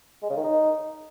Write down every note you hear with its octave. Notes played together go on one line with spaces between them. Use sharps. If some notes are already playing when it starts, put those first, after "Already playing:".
G#3
C#3
D#3
D#4